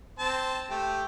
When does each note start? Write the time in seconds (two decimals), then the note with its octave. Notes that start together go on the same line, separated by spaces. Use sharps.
0.19 C4 A5
0.70 A3 G4